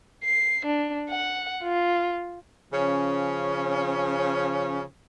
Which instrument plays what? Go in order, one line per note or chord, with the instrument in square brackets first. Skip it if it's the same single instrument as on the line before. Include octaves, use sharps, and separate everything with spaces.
[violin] C7
D4
F#5
F4
[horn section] C#3 F3 C#4